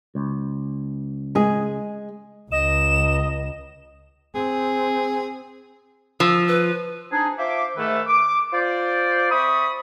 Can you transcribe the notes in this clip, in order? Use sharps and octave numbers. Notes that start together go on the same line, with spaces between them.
C#2
G#3 G#4
C#2 D#5 E7
C4 G#4
F3 E6
B4
C4 D4 D#4 G#4
F4 C5 E5 D6
G#2 D#3 A3 A4 B4 E5
D6
F4 C5 D5
C4 E5 B5 C#6 D#6